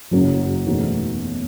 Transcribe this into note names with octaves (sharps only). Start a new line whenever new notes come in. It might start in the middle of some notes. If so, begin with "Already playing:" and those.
F#1 F#2 C#3 F#3
E2 B2 A3 D#4 F#4